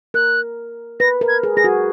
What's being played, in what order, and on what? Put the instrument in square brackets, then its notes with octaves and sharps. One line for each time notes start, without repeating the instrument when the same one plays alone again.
[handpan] A#4 [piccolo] F#6
[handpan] B4 [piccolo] A#6
[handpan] A#4
[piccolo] G#6
[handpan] G#4
[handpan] G#4 [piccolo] A#6
[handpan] F#4